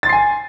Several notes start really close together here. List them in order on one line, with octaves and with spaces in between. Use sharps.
A6 C6 C7 G#5